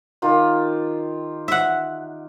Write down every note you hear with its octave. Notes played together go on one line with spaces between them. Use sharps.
D#3 F4 G4
E5 F#5